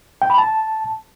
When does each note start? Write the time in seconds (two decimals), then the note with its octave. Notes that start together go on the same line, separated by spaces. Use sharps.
0.22 G5
0.30 B5
0.38 A5